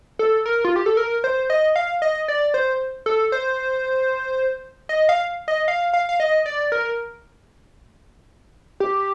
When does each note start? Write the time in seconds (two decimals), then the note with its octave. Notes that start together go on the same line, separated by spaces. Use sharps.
0.19 A4
0.46 A#4
0.65 F4
0.76 G4
0.86 A4
0.97 A#4
1.24 C5
1.50 D#5
1.76 F5
2.02 D#5
2.28 D5
2.54 C5
3.06 A4
3.32 C5
4.89 D#5
5.09 F5
5.48 D#5
5.68 F5
5.93 F5
6.09 F5
6.20 D#5
6.46 D5
6.72 A#4
8.80 G4